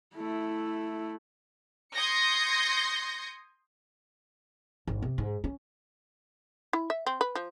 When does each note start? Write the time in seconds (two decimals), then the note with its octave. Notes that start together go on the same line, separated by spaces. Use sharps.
0.15 A3 E4
1.93 C6 D#6 G6 G#6 A#6 C#7
4.87 G#1
5.02 C3
5.18 G#2
5.44 C#4
6.73 E4
6.90 E5
7.06 C4
7.21 B4
7.35 F3